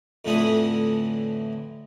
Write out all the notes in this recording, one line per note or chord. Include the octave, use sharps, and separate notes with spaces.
F2 A2 D3 E3 E4 D#6